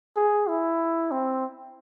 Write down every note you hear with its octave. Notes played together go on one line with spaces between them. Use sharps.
G#4
E4
C4